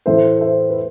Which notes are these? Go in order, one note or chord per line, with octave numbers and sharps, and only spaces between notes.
A2 E3 A3 C5 E5
C5 E5
B4